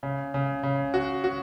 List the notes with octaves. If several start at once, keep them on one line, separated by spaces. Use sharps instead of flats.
C#3
C#3
C#3
F#4
F#4